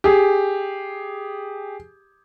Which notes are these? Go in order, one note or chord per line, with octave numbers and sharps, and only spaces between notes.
G4 G#4